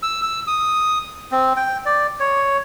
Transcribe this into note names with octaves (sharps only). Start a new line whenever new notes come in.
E6
E6
D#6
C4
G5
D5
C#5